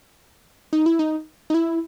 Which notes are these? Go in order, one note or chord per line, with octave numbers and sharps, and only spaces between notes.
D#4
E4
D#4
D#4
E4